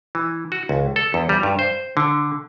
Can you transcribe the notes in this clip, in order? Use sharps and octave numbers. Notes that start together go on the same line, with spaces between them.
E3
F#4
C#2
A4
E2
G3
G2
C5
D3